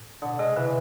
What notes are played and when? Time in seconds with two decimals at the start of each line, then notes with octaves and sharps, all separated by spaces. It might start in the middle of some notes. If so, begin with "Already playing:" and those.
Already playing: A2
0.21 B2 D3
0.39 C3 G#3
0.56 D3 E3